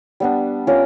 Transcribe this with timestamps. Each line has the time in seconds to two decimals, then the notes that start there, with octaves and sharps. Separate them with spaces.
0.20 G3 B3 D4
0.67 C#4 F4 A#4 D5